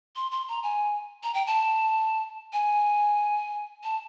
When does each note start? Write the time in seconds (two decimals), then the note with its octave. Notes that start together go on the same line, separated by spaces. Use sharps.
0.16 C6
0.32 C6
0.49 A#5
0.63 G#5
1.23 A#5
1.34 G5
1.47 A5
2.53 G#5
3.84 A5